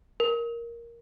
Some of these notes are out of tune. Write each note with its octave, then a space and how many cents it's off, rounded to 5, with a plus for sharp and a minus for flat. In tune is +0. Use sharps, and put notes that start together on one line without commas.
A#4 +5